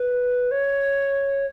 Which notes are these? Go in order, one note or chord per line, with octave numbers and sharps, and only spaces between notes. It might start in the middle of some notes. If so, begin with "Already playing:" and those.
Already playing: B4
C#5